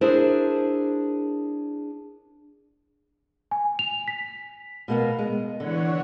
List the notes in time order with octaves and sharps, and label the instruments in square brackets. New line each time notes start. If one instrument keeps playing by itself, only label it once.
[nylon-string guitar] D4 E4 G#4 A#4 C5
[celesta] G#5
F7
B6
[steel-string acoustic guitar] B2 A#3 B3
G#3
[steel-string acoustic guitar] D3 [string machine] E3 C#5 F#5